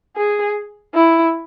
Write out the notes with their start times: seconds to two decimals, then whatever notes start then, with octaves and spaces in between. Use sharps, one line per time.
0.17 G#4
0.94 E4